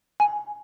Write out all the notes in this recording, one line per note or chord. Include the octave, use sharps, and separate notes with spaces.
G#5